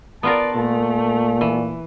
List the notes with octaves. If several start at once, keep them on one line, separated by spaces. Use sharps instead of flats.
B3 F4 A#4 D5 A5
A#2 A3
E3